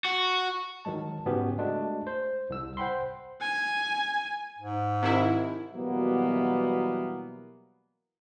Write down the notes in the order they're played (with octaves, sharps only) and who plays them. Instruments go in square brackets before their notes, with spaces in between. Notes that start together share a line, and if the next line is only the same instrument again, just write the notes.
[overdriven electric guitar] F#4
[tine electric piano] D#3 F#3 G#3 A5
G#2 C#3 B3 C#4 F#4 G4
G#3 A3 D4 F#4
C5
C2 E6
C5 F#5 G5 B5 C6
[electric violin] G#5
[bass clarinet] G#2
[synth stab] C3 D#3 E4
[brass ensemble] B2 E3 F#3 G3 A#3 B3